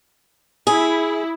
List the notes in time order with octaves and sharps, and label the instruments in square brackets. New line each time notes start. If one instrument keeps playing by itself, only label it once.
[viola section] E4 [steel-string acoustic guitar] G#4